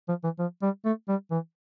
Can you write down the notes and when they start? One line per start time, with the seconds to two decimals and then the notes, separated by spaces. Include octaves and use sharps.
0.09 F3
0.24 E3
0.39 F3
0.63 G3
0.85 A3
1.09 G3
1.31 E3